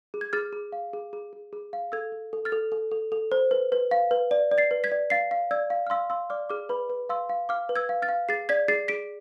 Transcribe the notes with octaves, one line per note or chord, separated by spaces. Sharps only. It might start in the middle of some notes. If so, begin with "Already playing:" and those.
G#4
G#6
G#4 F6 A6
G#4
F5
G#4
G#4
G#4
G#4
F5
A4 E6 G#6
A4
A4
F6 A6
A4
A4
A4
A4
C5
B4
B4
F5
B4
D5
D5
A6 C7
B4
G#6 B6
D5
F5 A6 C7
F5
D5 E6 G#6
F5
F6
F5 C6 E6
F5 C6 E6
D5 D6 F6
G#4 D6 F6
B4 B5 D6
B4
F5 C6 E6
F5
F5 D6 F6
B4
E6 G#6
F5
F6 A6
F5
G#4 A6 C7
D5 G#6 B6
G#4 A6 C7
G#4 B6 D7